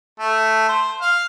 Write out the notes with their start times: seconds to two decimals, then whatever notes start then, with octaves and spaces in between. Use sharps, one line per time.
0.20 A3
0.68 C5
1.01 F5